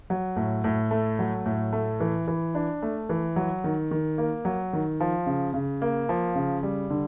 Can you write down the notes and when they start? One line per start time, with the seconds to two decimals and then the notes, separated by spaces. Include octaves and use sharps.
0.10 F#3
0.36 A2
0.64 A2
0.91 A3
1.19 F#3
1.46 A2
1.73 A3
2.00 E3
2.28 E3
2.55 D4
2.82 A3
3.09 E3
3.36 F#3
3.64 D#3
3.91 D#3
4.18 A#3
4.45 F#3
4.73 D#3
5.00 F3
5.26 C#3
5.54 C#3
5.82 A#3
6.09 F3
6.35 C#3
6.63 G3
6.90 D3